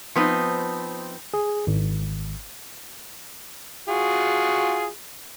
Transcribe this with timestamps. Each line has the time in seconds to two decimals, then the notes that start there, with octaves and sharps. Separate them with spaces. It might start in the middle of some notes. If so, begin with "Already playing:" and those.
0.16 F3 B3 C4 D#4
1.34 G#4
1.67 G#1
3.88 F4 F#4 G#4